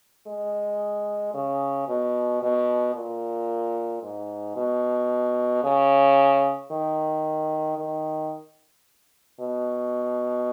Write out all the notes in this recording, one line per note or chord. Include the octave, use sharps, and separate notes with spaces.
G#3
C#3
B2
B2
A#2
G#2
B2
C#3
D#3
D#3
B2